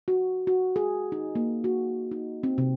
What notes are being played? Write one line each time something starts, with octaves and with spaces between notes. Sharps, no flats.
F#4
F#4
G#4
D#4
A#3
F#4
D#4
C4
C3